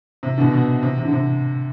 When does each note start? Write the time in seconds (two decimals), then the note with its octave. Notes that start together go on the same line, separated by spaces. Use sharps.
0.23 C3
0.38 B2 D3
0.53 B2
0.83 C3
0.98 C3
1.05 D3
1.13 C3